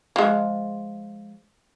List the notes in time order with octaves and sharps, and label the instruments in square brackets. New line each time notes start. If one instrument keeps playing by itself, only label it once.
[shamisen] F3 G#3